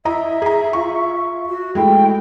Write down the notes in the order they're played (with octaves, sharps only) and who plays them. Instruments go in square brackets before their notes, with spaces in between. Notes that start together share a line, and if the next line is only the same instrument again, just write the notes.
[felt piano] E4 D#5 A#5 [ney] E5
[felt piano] G#4 A#5
F4 C#6
[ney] F#4
[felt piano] G#3 A3 E4 [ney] G5